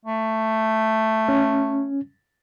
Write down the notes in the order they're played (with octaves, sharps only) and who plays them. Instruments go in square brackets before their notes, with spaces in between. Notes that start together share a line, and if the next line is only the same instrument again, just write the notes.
[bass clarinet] A3
[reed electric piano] C#4